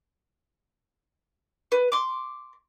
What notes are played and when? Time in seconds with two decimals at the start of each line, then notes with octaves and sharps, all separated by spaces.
1.72 B4
1.92 C6 D6